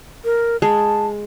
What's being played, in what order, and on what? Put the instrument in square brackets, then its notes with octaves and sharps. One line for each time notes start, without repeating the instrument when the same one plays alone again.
[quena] A#4
[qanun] G#3 [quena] A5